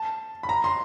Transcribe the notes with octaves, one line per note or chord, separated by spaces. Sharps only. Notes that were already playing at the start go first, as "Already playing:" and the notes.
Already playing: A5
B5
A#5
C6